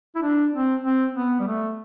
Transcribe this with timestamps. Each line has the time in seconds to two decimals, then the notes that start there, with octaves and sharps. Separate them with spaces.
0.15 E4
0.22 D4
0.53 C4
0.84 C4
1.15 B3
1.40 G3
1.47 A3